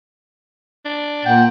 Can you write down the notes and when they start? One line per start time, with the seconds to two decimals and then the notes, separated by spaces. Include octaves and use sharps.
0.85 D4
1.25 A#2 F#5 G5